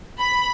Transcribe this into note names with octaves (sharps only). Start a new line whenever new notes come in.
B5